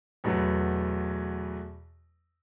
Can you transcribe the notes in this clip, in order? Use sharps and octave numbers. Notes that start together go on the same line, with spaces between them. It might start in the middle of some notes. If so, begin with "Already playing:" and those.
E2 B2 F#3 A3